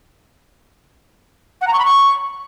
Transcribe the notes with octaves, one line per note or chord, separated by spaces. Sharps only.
F#5
A#5
C#6
B5
C#6